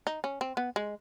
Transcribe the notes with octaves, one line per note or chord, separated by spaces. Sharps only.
D#4
C#4
C4
B3
G#3